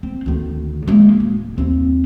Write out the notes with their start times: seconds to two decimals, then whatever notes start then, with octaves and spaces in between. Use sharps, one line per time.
0.03 C4
0.26 D2 D#3
0.88 G#3 A#3
1.20 D1
1.58 D#2 C4